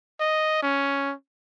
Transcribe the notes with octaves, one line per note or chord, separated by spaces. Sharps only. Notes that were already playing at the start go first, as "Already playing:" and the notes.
D#5
C#4